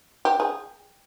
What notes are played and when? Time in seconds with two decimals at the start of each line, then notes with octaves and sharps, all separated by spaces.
0.25 G4
0.40 G#4